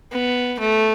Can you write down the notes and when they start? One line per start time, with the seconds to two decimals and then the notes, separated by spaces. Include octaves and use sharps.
0.12 B3
0.60 A3